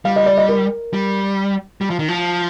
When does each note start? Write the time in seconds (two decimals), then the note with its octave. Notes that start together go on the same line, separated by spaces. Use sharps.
0.05 G3 F5
0.16 D#5
0.26 D5
0.38 D#5
0.49 A#4
0.93 G3
1.81 G3
1.90 F3
1.99 D#3
2.08 F3